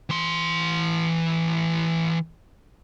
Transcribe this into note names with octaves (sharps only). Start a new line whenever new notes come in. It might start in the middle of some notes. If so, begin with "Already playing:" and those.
E3 C6